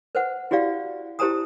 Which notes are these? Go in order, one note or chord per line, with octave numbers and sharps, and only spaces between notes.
B4 C5 F#5
E4 F#4 G4 D5 F5
E4 G4 C5 A5 A#5 D#6